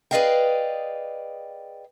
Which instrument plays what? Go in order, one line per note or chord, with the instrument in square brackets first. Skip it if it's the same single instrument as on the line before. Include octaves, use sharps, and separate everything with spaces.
[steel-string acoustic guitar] G#4 B4 D5 D#5 F5 G5